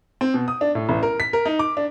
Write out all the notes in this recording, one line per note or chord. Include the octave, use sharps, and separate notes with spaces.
C4
B2
D#6
D4
A2
A1
A#4
B6
A#4
D#4
D6
D4